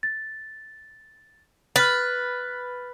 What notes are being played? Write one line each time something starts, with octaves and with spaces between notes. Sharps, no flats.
A6
B4 F6 A6